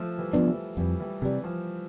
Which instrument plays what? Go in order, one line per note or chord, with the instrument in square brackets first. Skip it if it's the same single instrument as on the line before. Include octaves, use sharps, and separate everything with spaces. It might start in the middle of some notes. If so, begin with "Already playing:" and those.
Already playing: [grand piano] F3 A3
E3 G3
[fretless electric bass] F3 B3 D4
[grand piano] A3
E3 G3
[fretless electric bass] F2 [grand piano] E3 G3
[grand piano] E3 G3
[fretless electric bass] C3 G3 [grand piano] E3
[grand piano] F3